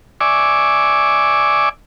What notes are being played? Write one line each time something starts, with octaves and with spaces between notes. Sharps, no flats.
D5 E5 G#5 C#6 D6